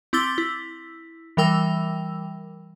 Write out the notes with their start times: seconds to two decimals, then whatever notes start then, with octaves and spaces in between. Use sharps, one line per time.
0.13 C4 E4 D6 E6 A6 G7
0.38 E4
1.37 E3 G3 A#4 G5 E6